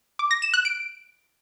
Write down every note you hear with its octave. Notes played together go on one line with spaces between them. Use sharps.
D6
A#6
E7
F#6
D7